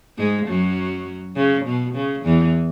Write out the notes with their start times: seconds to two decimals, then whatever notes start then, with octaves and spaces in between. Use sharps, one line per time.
0.18 G#2 G#3
0.47 F#2 F#3
1.35 C#3
1.65 B2
1.95 C#3
2.25 E2 E3